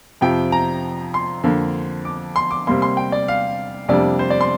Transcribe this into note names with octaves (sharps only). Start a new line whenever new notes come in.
F2 C3 F3 G5
A#5
C6
F2 D3 A#3
D6
C6
D6
C3 G3 A#3 C6
C6
G5
D5
F5
F2 C3 G3 A#3 D4 D5
C5
D5
C6